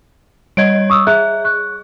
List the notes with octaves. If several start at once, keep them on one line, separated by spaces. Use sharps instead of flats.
G3 C#5 D#5 G#6 D7
C#6 D#6 E6
G#4 E5 A#5 F#6
C#6 F#6